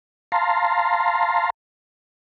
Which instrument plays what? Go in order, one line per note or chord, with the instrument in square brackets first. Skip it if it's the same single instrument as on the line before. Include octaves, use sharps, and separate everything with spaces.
[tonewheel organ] F5 A5 A#5 C6